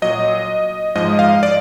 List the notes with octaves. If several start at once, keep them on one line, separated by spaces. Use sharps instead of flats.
A#2 F#3 D#5
G#2 F3 G#3 D#5
F5
D5